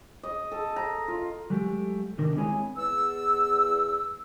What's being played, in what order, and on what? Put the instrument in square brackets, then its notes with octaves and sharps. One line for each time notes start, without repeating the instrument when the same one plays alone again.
[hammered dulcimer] D#5
A4
A#5
F4
[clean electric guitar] F#3 G#3 A3 G4
C3 D#3 D4 A#4
G#3 C4 E4 G#4 C#5 G#5
[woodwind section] E2 E6